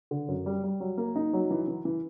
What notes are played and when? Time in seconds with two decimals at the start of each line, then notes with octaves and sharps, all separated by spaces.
0.11 D3
0.28 F#2
0.46 G3
0.64 G3
0.80 F#3
0.98 A#3
1.16 D#4
1.33 F#3
1.50 E3
1.68 E3
1.85 E3